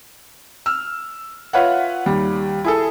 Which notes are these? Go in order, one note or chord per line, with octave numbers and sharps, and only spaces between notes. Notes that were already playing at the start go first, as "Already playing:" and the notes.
E6 F6
F4 B4 C#5 E5 F#5
D#2 G3
E4 G#4 A4